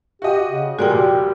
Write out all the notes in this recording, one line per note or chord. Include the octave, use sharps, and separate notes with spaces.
F#4 G4 D#5
C#3
A#2 G3 F#4 G#4 A#4 D5 G5
F1 G4